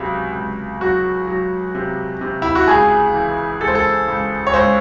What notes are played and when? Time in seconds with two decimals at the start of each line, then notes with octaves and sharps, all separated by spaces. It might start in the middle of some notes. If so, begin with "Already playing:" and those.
Already playing: C#2 C3 F#3
0.35 C#2
0.81 F#3 F#4
1.28 F#3
1.75 C3
2.21 C3
2.42 E4
2.55 F#4
2.68 C#2 G#4
3.14 E3
3.61 C#2 A4
3.68 C5
3.75 A4
4.08 C#2
4.47 C#5
4.54 C#2 C5